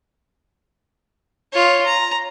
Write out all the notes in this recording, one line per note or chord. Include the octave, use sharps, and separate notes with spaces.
F4 C#5
A#5